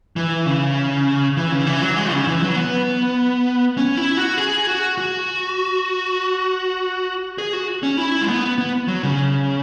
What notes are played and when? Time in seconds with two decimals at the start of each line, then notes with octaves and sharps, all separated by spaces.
0.16 E3
0.46 C#3
1.37 E3
1.52 C#3
1.67 E3
1.82 F#3
1.97 G#3
2.12 C#3
2.27 E3
2.42 F#3
2.56 B3
3.77 C#4
3.97 E4
4.17 F#4
4.37 G#4
4.67 F#4
4.98 F#4
7.38 G#4
7.53 F#4
7.83 C#4
7.98 E4
8.21 G#3
8.28 B3
8.58 B3
8.88 F#3
9.03 C#3